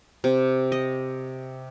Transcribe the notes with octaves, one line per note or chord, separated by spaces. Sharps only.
C3
D#5